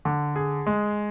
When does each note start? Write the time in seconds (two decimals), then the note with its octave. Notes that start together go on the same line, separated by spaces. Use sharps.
0.05 D3
0.36 G#4
0.67 G#3